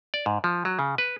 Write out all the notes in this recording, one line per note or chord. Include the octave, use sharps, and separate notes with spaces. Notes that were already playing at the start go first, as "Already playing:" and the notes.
D5
G#2
F3
F#3
C#3
B4